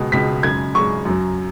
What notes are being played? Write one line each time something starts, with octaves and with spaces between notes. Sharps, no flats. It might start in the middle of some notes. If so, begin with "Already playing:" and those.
Already playing: C#2 B2 G#3
C#2 B2 G#3 B6
F#2 C#3 G#3 G#6
F#2 C#3 G#3 C#6
F#2 F#3